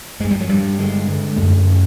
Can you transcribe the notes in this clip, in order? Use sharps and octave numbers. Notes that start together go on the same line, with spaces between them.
G2 G#3
G3
F#3
G2 G3
D3 G#3
D3
F#2 A3
C#3